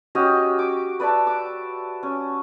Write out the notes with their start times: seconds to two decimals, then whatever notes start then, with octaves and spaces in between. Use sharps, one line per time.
0.15 C#4 F#4 G4 D#5
0.59 D6
1.00 B4 D5 E5 A5
1.27 D6
2.03 C#4